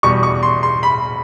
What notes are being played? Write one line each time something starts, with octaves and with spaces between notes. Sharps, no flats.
E2 B2 G3 C#6
C#6
C6
C6
B5